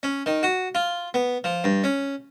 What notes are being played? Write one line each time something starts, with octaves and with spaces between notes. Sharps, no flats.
C#4
D#3
F#4
F4
B3
F3
G2
C#4